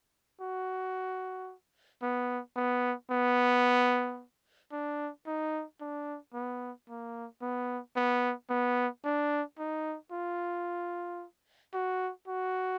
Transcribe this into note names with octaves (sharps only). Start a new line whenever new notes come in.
F#4
B3
B3
B3
D4
D#4
D4
B3
A#3
B3
B3
B3
D4
D#4
F4
F#4
F#4